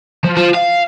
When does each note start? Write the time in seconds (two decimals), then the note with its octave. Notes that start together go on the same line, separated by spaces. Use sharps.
0.24 F3
0.37 F4 C5
0.55 F5